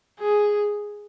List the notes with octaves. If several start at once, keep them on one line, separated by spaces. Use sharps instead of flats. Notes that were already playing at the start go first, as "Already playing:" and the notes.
G#4